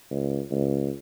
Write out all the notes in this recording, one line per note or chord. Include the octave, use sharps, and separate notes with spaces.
C#2
C#2